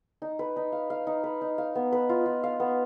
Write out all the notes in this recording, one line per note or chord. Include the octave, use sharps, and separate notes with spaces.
D#4
B4
D#4
F5
F5
D#4
B4
D#4
F5
B3
B4
F4
F4
F5
B3